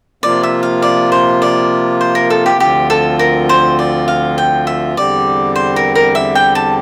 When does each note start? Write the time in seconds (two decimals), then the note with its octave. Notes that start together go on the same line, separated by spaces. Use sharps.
0.23 C3 F3 A#3 F4 D5
0.43 E5
0.63 F5
0.82 D5
1.12 C5
1.42 D5
2.01 C5
2.15 A#4
2.30 A4
2.46 G4
2.59 D2 D3 F3 C4 F4 G4
2.90 A4
3.19 A#4
3.49 C5
3.79 D5
4.08 F5
4.38 G5
4.67 E5
4.97 E2 D3 G3 C4 G4 D5
5.56 C5
5.76 A#4
5.95 A#4
6.15 E5
6.35 G5
6.55 A5